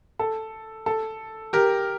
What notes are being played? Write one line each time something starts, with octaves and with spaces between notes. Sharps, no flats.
A4
A4
G4 A#4